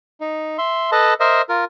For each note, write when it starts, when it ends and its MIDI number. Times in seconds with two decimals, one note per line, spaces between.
0.20 0.57 63
0.58 0.91 76
0.58 0.91 84
0.92 1.14 69
0.92 1.14 71
0.92 1.14 75
0.92 1.14 81
1.20 1.42 70
1.20 1.42 72
1.20 1.42 75
1.20 1.42 76
1.49 1.65 65
1.49 1.65 70